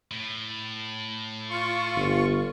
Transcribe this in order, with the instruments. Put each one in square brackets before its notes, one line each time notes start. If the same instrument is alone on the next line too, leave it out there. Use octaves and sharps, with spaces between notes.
[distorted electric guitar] A2
[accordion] F4 C#6
[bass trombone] G1